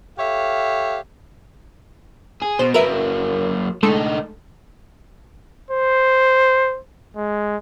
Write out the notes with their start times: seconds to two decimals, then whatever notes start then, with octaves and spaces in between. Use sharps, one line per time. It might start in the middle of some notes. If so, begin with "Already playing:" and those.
0.19 G4 A4 C#5 E5 F5
2.42 G#4
2.59 B2 C5
2.74 F#3 A#3 A#4 B4 E5
3.83 D3 G#3 A3 D#4 A4
5.71 C5
7.16 G#3